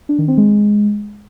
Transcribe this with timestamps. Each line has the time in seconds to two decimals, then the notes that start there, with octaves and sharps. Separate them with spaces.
0.09 D4
0.19 D#3
0.28 C4
0.38 G#3